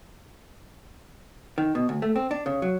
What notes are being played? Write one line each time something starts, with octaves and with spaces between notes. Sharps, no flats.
D#3
B2
D2
A3
C4
D4
C#3
F#3